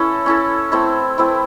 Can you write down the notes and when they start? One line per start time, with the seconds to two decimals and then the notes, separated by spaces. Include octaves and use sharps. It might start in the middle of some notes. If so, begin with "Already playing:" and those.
Already playing: C#4 E4 A4
0.26 C#4 E4 A4
0.72 A3 C4 E4
1.18 A3 C4 E4